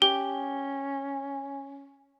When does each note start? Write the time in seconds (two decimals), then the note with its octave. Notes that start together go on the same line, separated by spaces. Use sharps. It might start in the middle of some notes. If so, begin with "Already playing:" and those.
0.02 C#4 G4 G7